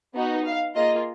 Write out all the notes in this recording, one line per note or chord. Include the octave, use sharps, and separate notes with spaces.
B3 D#4 F#4
F5
A#3 F4 G#4 D#5